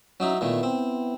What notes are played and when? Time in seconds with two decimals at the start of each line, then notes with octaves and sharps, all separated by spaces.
0.20 F#3 C#4 D#4 E4
0.41 A#2 D#3 A3 B3 E4
0.63 C4